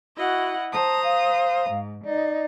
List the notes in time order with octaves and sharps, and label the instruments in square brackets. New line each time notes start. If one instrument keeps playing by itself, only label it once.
[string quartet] E4 D#5 F#5 [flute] F#4
[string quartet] C5 A#5 D#6 [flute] A5
[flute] F5
[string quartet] G#2
[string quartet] D#4 [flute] D5